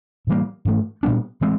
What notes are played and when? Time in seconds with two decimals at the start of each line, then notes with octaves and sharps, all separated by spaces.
0.27 A2 E3 G3 A#3
0.65 G#2 E3 A3
1.03 A#2 G3 B3 D4
1.41 E3 G#3 C4